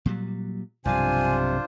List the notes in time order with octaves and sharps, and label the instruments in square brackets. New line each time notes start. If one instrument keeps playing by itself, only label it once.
[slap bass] A#2 F#3 G3
[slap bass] B1 G2 F3 [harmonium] C3 [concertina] D4 F4 C5 [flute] G#5